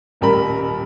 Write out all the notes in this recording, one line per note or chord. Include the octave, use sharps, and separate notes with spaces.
D#1 A1 G3 A#4 B5